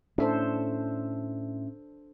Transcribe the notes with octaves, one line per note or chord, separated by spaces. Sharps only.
A2 C#4 D4 A4 C5 E5